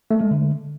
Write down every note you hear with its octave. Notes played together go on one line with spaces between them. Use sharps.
A3
G#3
D3